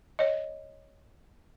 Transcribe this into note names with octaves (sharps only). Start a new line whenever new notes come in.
C#5 D#5